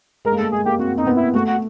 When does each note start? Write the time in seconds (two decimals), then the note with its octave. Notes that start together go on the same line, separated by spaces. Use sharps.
0.25 G#3 A#4
0.32 A#3
0.38 A3 A4
0.52 G#3 G#4
0.65 A#3 G4
0.79 C4 F#4
0.98 C4 D#4
1.07 B3
1.16 E4
1.34 A3 F#4
1.47 F#4